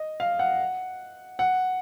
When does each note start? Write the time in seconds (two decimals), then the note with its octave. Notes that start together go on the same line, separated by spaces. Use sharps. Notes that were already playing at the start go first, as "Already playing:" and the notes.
Already playing: D#5
0.20 F5
0.39 F#5
1.39 F#5